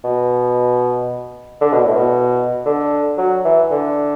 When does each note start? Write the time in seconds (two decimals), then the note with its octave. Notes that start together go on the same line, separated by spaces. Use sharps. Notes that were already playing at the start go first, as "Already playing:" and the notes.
0.04 B2
1.61 D3
1.73 B2
1.84 A2
1.96 B2
2.66 D3
3.18 F#3
3.45 E3
3.71 D3